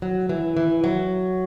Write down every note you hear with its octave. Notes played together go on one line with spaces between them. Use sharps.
F#3
E3
E3
F#3